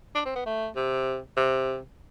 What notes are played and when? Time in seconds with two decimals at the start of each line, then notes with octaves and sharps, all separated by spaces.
0.15 D4
0.26 C4
0.36 B3
0.46 A3
0.76 C3
1.37 C3